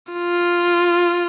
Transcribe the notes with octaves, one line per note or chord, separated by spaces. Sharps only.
F4